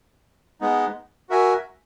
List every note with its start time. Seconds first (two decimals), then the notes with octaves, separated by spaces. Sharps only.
0.61 G#3 B3 D#4
1.29 F#4 A#4 E5 G#5